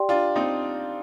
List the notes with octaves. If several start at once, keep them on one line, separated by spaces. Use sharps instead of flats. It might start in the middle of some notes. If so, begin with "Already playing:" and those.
Already playing: G4 D5 G5 C6
D4 F4
C4 D#4